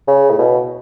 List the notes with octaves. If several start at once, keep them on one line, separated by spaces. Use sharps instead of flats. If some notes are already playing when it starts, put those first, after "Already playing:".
C#3
A2
B2